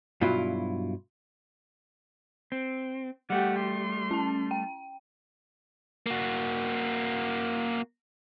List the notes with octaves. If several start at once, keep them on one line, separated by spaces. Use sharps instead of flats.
G2 B2 F#3 E4 F4
C4
G3 A3 G4 F#5
C6
C#4 A5
G5
A#3 F#4